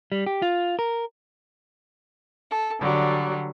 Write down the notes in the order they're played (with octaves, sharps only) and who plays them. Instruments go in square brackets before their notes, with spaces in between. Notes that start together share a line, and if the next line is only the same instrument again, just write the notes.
[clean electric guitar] G3
G4
F4
A#4
[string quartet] A4
D3 F#3 G3